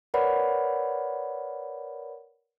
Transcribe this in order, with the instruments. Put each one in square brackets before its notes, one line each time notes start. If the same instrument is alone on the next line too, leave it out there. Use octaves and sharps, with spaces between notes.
[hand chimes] A#4 B4 C#5 D5 F#5 B5